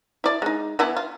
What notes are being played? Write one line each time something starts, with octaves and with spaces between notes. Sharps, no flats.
E4 D5
G#3 D#4
E3 B3 E4
F4